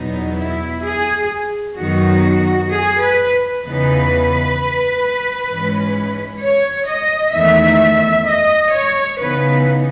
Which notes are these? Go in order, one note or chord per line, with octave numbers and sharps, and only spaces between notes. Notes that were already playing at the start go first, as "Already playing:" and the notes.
Already playing: E2 B2 F#3 B3 D#4
E4
G#4
F#2 D#3 F#3 B3 D#4 F#4
G#4
B4
E2 C#3 E3 B3 D#4 B4
G#2 E3 G#3 C#4
C#5
D#5
E2 D#3 A3 E5
D#5
C#5
C#3 E3 B3 D#4 B4